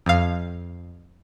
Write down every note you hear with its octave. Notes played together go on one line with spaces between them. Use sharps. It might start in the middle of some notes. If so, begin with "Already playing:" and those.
F2 F5